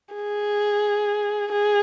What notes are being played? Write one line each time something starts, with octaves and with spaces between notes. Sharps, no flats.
G#4
G#4